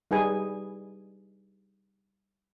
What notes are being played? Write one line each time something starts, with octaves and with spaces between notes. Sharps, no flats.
G3 D#4 G#4 B4 G#5